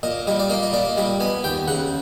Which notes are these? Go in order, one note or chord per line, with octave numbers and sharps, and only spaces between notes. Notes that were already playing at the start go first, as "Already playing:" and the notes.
A#2 D#5
G3 D#5
D5
A#3 D#5
D#5
A#2 D5
G3 D#5
B3 G#5
D#2 G5
C#3 F#5